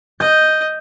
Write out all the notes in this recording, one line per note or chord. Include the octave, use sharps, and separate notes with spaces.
D#5 G6